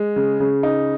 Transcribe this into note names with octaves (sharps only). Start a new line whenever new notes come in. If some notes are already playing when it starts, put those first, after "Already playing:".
Already playing: G#3
C#3
C#3
D#4